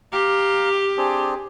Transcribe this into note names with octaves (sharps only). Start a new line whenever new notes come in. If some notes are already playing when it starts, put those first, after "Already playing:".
G4 F5 A#5
C4 D4 G#4